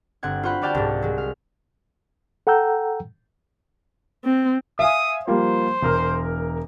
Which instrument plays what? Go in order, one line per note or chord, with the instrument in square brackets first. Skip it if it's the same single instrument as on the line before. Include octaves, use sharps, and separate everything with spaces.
[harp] G1 C4 F#5 G#6
F4 F#4 C5 F#5 B5
F#4 G4 D5 F5 G5 A5
C2 G#2
F#3 G#3
F5
[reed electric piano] A4 F#5 G5 A#5 E6 G6
[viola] C4
[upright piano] E5 F5 G#5 [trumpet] D#6
[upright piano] F3 G3 A#3 [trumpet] C5
[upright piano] E1 A#4 F6